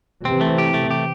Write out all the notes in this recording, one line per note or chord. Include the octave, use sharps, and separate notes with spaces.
C3 E3 C4
A3
G4
A3
G4